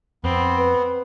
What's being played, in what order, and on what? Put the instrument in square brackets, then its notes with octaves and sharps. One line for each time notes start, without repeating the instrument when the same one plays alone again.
[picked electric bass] F2 [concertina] B3 [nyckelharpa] C4
[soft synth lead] B4